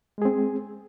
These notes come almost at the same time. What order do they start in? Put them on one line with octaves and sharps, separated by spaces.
G#3 G#4 C4